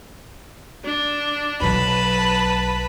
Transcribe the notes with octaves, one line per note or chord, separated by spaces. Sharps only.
D4
B1 F#3 B4 A5 B5